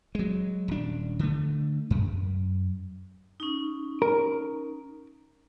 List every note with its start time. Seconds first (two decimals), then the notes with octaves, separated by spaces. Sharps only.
0.15 F#3 G#3
0.68 D#1 D4
1.19 D3 A3
1.90 F#2
3.40 C#4 D#4
4.02 A#4